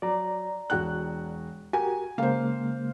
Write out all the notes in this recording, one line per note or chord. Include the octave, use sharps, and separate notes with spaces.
F#3 D5 A#5
E1 F#4 F#6
F#4 G4 A#4 G#5
C#3 G#3 A#3 C5 F5